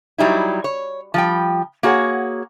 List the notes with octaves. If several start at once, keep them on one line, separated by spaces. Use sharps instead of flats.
F#3 G3 D#4 E4
C#5
F3 G3 G5
A#3 F#4 G#4 C#5 F#5